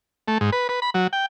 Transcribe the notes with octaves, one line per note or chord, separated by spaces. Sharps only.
A3
G#2
B4
B4
B5
F#3
G5